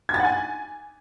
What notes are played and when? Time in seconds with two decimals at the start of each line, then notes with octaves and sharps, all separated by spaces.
0.09 G#6
0.14 A6
0.19 F#5
0.25 G#5